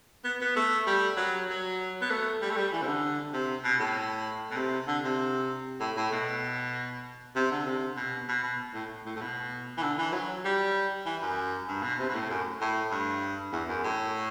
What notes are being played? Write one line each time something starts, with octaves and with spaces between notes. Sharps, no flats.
B3
B3
A3
G3
F#3
F#3
B3
A3
G3
A3
G3
E3
C3
D3
C3
B2
A2
B2
C3
D3
C3
A2
A2
B2
C3
D3
C3
B2
B2
B2
A2
A2
A2
B2
E3
D3
E3
F#3
G3
E3
F#2
G2
B2
C3
B2
A2
F#2
A2
G2
E2
F#2
A2